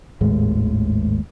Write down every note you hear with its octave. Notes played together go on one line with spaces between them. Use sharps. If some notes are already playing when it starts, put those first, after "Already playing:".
G#1 D#2 A2 G#3